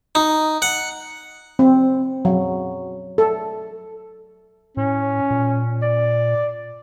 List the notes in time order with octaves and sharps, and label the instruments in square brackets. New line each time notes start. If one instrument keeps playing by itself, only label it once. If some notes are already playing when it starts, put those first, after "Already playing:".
[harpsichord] D#4
F#5
[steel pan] C4
F#3
A4
[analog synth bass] A2 [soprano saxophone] C#4
[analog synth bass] A#2
[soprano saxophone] D5